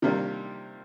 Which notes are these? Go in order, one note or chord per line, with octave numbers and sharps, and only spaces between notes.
C3 D#3 G3 A#3 D4